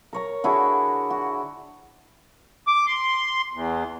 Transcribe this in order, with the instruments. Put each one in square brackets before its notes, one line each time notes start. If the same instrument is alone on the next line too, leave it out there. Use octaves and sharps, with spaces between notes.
[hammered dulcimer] A#4 C#5 A#5
D3 E4 F#4 G#4
F#4
[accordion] D6
C6
E2